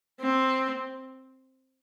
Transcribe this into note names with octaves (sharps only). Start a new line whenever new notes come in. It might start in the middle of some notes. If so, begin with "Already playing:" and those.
C4